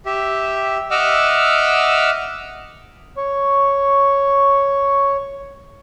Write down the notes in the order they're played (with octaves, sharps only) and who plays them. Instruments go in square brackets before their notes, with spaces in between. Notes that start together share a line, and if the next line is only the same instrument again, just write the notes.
[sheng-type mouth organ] G4 E5
D#5 E5 F#5 D6 E6 F6
[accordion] C#5 C#6